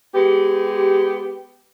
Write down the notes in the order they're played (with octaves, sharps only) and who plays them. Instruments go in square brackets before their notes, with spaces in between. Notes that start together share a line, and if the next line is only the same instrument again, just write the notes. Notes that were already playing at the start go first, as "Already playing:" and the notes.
[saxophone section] G#3 B3 G4